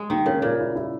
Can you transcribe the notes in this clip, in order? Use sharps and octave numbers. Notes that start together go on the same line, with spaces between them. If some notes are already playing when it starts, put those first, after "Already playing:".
Already playing: G#3
D#3 A#3
C#3 A#4
A#2 A#4
E4
E4